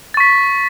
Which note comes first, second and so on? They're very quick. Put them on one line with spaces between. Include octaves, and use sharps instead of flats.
A6 C#6 B6